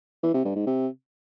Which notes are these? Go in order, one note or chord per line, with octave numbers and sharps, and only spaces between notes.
E3
C3
G2
G#2
C3